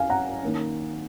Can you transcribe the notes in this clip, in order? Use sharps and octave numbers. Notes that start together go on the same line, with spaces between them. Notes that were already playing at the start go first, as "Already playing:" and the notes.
Already playing: F#2 F5 G#5
F#5 A#5
D#3 A#3 C#4